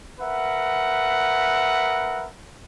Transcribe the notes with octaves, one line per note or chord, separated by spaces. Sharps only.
A#4 B4 E5 F#5